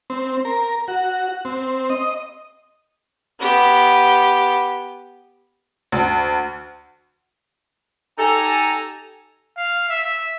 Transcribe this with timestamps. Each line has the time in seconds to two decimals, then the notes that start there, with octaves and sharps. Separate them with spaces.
0.10 C4
0.45 A#4
0.88 F#4
1.45 C4
1.90 D#5
3.39 B3 G4
5.92 D2
8.18 D#4 G4 A4 G#5 A#5
9.57 F5
9.89 E5